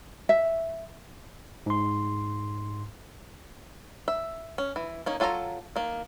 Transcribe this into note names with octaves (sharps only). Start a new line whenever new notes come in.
E5
G#2 C6
E5
C#4
E3
A#3 C#4 D#4
F#3 F4 A4 G#5 A#5
D#3 A#3